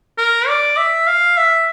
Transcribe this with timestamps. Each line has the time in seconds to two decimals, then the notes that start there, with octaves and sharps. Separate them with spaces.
0.18 A#4
0.48 D5
0.77 E5
1.07 F5
1.37 E5